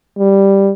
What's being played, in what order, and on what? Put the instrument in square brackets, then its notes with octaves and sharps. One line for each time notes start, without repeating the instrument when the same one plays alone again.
[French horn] G3